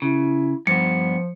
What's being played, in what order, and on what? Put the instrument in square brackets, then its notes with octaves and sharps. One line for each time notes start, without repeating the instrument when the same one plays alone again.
[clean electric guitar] C#3 [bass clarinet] E4
[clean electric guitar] G2 B3 [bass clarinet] F3 [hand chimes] C#7